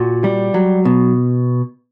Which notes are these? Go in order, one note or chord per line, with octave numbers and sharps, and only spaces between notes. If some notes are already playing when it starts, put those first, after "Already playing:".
Already playing: A#2 F#4
G3
F#3
B2